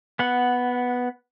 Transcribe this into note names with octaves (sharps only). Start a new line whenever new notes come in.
B3 F#5